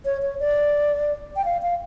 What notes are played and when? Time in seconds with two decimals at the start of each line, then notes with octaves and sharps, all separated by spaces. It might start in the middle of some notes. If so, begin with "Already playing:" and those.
0.05 C#5
0.22 C#5
0.40 D5
1.36 G5
1.45 F5
1.62 F5